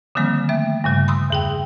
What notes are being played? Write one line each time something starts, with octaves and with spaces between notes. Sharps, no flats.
D3 D#3 F3 G3 A#3 C4
A3 E5
G2 C#3 G3
B5 C6 D#6 E6
E2 G#4 G5